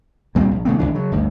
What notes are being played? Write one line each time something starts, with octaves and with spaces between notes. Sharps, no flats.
D2 A#2 G3 C4
A#1
C#3 A3 B3 C4
G#1 F2 E3 D4
C#3 F#3
G1 D2